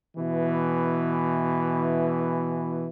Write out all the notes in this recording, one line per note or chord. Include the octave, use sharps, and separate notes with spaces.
B2 E3